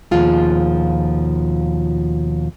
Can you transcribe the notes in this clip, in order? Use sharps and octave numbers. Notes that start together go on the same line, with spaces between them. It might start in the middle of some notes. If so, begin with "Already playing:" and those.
D#2 B2 F3 G#3 F4 G#4